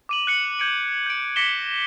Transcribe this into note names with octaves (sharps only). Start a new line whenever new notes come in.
D6 D#7 F#7
F#6 C#7 F#7
G6 G#6 C#7 D7
G6 D7
D6 A#6 B6 C#7 E7 G7